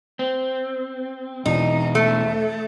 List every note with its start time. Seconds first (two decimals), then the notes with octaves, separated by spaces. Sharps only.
0.19 C4
1.46 E2 B2 E3 D#4
1.95 A3